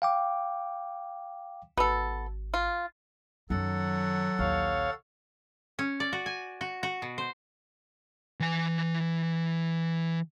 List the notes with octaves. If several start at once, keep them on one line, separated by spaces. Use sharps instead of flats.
F5 G5 D6
G#1 B3 A4
F4
F#2 D#3 F#3 A4 F#5
A#1 D#2 C#5 F5
C#4
D5
F#4
G#5
F#4
F#4
B2
C5
E3 G#5